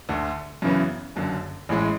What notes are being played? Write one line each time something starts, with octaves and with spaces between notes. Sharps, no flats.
D2 D3 A3
F#2 C#3 E3 B3
F#1 F#2 D3
A1 A2 E3 G#3